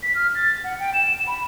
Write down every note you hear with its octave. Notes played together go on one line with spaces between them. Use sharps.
B6
F6
A6
F#5
G5
E7
B5